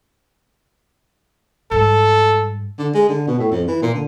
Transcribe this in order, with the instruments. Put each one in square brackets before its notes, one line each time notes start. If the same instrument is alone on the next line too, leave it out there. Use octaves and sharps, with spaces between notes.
[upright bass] G#2 G3 [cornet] A4
[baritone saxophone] D3
G#3
D3
B2
A2
F2
E3
A#2
D3